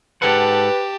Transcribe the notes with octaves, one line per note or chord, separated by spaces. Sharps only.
G#2 G4 A4 B4 F#5 A5